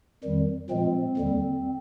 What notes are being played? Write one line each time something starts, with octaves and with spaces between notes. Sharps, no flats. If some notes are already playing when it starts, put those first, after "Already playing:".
F2 D#3 G3
A#2 F3 G#3 C4
D#2 D3 G3